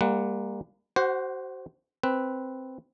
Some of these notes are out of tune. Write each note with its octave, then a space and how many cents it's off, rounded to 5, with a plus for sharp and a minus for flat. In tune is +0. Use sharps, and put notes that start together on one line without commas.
G3 +40 A#3 +0 F#5 +5
F#4 +30 C5 +0 F#5 +0
C4 +0 B4 +0